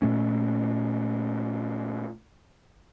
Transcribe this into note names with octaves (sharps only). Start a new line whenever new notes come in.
A#2 A3 C#4